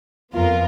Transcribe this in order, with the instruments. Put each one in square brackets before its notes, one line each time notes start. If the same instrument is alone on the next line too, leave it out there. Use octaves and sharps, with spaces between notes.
[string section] F2 F3 B3 F4 A#4